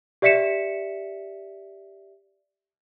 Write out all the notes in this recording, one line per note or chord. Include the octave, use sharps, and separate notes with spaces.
G4 D5 E5 B6 C#7 E7